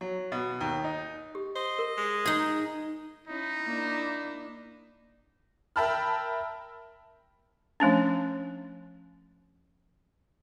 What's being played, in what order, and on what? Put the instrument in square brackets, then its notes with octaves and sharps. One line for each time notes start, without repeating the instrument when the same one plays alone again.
[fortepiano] F#3
B2
D#2
D#4
[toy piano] G4
[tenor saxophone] C5 [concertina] D#5
[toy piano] A#4
[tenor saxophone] G#3
[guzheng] D#4 G#4
[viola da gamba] C#4 E4 [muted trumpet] D#4
[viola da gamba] A#3 D4 E4
[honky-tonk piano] A#4 E5 G5 A5 B5 F6
[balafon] F3 A3 C#4 D4